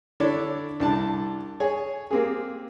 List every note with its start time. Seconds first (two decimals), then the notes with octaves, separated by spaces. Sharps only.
0.20 D3 D4 E4 A4 C#5 D5
0.80 C2 D4 A5
1.60 G#4 C#5 G#5
2.11 A#3 C4 G4 G#4